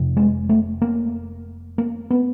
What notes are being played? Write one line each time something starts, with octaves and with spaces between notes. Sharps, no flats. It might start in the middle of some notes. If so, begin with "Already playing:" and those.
Already playing: F1 F2 C3
G#3
A3
A#3
A#3
B3